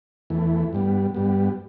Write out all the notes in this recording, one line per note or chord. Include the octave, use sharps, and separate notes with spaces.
E2 E3 A3
G2 G3 B3
G2 G3 B3